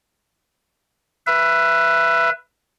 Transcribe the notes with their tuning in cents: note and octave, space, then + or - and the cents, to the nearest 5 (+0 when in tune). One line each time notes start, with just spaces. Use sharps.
B4 -5 E5 +20